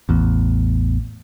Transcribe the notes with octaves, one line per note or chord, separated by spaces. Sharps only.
A1 E2